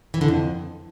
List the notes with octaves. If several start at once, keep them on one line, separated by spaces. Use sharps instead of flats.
E3
D3
F2